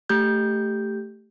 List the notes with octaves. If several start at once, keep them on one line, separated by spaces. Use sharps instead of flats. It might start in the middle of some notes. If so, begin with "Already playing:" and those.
A3 G4 G6